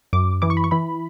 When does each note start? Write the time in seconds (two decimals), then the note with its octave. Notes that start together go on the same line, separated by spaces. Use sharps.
0.13 F#2 D6
0.42 E3 D6
0.50 C#6
0.57 B5
0.64 C#6
0.71 E3 B5